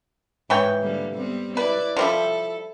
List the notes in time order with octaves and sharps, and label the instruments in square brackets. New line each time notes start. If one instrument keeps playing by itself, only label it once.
[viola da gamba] G#2 [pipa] E3 C#5 G5
[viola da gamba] D3 G3 A#3
G3 B3 C4
[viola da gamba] E4 D5 [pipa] B4
[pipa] F3 G3 E4 [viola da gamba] A4